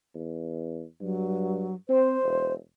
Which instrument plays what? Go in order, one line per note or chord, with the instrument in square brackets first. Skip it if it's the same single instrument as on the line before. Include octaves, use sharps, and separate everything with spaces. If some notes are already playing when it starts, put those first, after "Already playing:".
[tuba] E2
[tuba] G2 [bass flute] F#3
[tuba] C4 [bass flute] C5
[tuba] E1